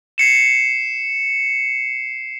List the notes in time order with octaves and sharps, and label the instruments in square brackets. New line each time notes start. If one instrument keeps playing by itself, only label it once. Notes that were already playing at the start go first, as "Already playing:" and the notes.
[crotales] C7 C#7 E7